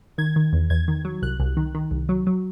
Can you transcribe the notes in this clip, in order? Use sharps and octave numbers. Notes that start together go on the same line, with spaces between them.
D#3 G#6
D#3
E2
E2 G#6
D#3
F#3
C2 F#6
C2
D#3
D#3
C2
F#3
F#3